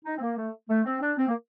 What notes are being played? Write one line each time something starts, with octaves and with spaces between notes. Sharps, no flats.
D#4
C4
A#3
A3
A3
C4
D4
C4
A#3